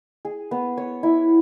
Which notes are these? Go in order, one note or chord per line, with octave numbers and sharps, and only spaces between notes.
G#4
B3
C#5
E4